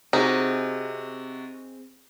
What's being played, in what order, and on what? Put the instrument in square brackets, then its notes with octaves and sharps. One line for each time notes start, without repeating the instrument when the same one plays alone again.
[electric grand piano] C3 F#4 [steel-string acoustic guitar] C4 G#4 [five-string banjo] D#4